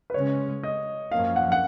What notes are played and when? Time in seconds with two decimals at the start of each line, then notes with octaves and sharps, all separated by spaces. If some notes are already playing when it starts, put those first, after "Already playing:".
0.10 B4
0.14 C#3 G#3 C#4 C#5
0.63 D#5
1.12 F#2 F3 A#3 C#4 F5
1.36 F#5
1.52 F#5